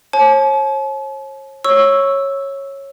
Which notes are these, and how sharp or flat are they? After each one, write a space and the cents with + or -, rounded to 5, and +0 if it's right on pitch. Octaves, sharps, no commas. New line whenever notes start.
C#5 -40 A5 -45
C#5 -15 C#6 +0 E6 +0